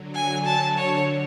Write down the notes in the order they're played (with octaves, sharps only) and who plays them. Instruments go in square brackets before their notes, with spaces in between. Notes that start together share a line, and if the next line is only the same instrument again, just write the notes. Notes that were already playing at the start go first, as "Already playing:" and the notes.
Already playing: [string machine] D3 F#3
[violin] G#5
A5
[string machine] D3 [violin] C#5